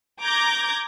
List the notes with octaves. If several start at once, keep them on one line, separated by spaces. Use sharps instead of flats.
A#5 D6 G6 G#6 A#6